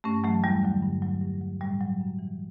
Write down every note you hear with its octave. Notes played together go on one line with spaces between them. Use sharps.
G2 A3 C#4
E3 F#3 A3
E2 G3
D3 F#3
G2
F#3
G2
F#3
A2 G3
F#3
F#2
E3